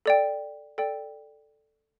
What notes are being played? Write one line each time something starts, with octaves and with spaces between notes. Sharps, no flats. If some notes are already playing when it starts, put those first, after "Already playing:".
A4 D5 G5
A4 D5 G5